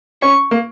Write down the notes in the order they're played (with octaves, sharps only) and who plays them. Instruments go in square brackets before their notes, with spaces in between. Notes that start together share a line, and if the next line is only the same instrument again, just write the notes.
[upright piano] C#4 [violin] C#6
[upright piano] A#3